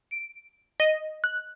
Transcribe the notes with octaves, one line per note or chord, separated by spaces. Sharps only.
D7
D#5
F#6